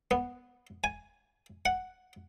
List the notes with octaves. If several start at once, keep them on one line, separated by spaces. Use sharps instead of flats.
B3
G#5
F#5